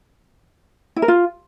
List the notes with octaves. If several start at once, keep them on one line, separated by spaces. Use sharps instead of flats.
E4
A#4
F4